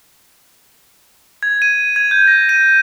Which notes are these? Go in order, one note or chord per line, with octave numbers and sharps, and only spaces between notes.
G#6
D#7
G#6
G6
A#6
D#7